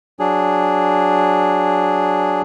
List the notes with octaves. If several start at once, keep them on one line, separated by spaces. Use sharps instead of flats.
F#3 D4 G#4